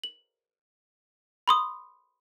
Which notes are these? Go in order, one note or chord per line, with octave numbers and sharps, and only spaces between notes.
F#7
B5 C6 D#6